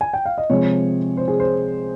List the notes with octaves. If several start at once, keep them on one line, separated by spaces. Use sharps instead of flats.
G#5
G5
F5
D#5
C3 F3 G#3 C#5
C5
G#4
C5